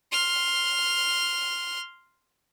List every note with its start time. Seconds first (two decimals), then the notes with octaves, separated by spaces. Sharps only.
0.12 C6 F6